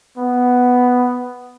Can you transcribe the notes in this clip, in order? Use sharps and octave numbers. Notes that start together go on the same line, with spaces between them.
B3